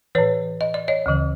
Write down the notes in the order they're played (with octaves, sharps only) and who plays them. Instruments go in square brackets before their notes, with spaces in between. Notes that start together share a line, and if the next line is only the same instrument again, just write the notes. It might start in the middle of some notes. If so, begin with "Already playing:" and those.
[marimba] A2 E3 B4 C#5
D#5
D5
C#5 D#5
D2 C#3 E3